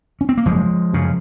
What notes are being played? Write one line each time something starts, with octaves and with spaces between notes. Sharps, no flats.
C#4
C4
A#3
F#1 F3 G#3
F#2 C#3